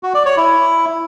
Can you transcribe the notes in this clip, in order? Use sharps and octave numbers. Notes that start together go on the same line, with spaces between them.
F#4
D5
C#5
E4